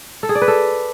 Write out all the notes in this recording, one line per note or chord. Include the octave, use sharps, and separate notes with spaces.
A4
G#4
D5
B4
A4